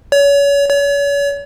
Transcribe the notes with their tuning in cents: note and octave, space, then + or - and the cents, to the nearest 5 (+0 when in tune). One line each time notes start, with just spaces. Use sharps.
C#5 +35
C#5 +40